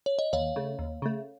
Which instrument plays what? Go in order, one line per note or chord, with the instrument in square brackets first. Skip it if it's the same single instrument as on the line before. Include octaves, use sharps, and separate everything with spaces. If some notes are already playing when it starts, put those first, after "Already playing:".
[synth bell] C#5
D#5
[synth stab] D#2 [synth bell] C#5 F5
[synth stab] C#3 A3
D#2
C#3 A3